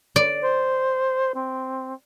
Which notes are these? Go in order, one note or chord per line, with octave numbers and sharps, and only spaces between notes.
D5
C5
C4